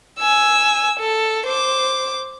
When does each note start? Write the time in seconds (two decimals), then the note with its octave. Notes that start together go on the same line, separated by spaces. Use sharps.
0.19 G#5 E6
0.99 A4
1.46 C5 D6